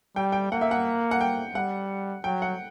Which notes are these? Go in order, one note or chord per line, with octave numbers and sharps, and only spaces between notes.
G3 G5
G5
A#3 F#5
E5
F#5
F#5
G5
G3 F#5
F#3 G5
F#5